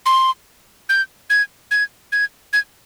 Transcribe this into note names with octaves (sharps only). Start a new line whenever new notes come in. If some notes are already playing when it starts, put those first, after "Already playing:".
C6
G6
G#6
G#6
G#6
G#6